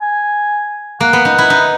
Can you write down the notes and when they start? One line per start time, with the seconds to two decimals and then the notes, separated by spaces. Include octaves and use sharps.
0.02 G#5
1.00 A#3 F#5
1.13 B3
1.25 D#4
1.38 E4
1.50 D#4